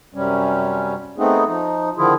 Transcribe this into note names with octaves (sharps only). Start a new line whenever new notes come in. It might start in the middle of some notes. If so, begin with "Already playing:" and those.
F#2 C3 G3 C#4
A3 B3 C4 D#4 G#4
F3 D#4
D3 D#3 F3 E4 F4 G#4